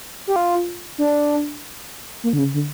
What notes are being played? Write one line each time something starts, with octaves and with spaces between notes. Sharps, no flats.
G4
F4
D4
A#3
D3
C#3
D3